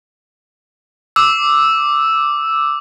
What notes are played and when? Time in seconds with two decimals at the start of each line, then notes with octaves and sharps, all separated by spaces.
1.16 D6 E6